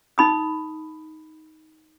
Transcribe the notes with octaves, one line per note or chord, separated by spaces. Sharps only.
D#4 B5 D#6